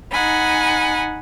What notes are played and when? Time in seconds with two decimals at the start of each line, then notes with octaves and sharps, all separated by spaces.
0.13 D#4 F#5 G#5 B5